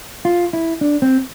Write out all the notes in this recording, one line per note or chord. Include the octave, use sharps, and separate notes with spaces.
F4
E4
D4
C4